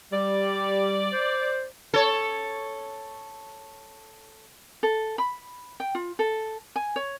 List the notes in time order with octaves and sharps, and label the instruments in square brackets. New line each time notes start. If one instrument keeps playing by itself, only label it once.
[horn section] G3 [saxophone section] D5
[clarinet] C5
[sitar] A4 C#5
[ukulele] A4
B5
G5
F4
A4
G#5
C#5